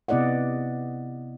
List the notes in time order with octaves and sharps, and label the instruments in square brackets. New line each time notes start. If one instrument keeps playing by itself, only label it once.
[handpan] C3 B3 E4 D5 D#5 F#5